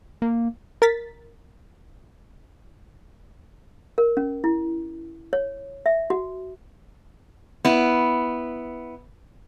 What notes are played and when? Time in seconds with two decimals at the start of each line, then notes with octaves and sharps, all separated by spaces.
0.22 A#3
0.82 A#4 A6 B6
3.98 A#4
4.17 C#4
4.44 E4
5.33 C#5
5.86 E5
6.10 F#4
7.65 B3 E4